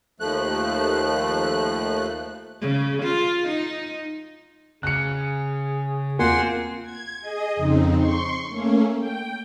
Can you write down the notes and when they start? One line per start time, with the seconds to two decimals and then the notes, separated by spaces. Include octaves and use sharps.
0.20 D#2 F3 A3 F#6
2.61 C#3
3.03 F4
3.48 D#4
4.83 C#3 G#4 F#6 C#7
6.19 E2 A#3 C4 F4 F#5 G#5 C6
6.82 G#6
7.20 G#4 D#5
7.56 F2 C#3 C4 D#4
7.97 C6 C#6
8.49 A3 A#3 C#4
8.98 G5